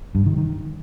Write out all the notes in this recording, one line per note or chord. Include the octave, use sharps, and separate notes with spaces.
G2
D#3
D#3